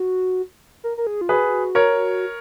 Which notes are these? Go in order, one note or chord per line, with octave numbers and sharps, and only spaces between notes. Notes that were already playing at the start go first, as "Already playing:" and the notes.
Already playing: F#4
A#4
A#4
G#4
F4
F#4 G#4 B4
A#4 C#5